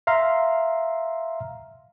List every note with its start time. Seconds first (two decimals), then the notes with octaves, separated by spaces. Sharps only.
0.07 E5 F5 A#5 C6